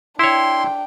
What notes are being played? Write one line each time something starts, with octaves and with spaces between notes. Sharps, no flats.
D4 E4 C#5 G5 C6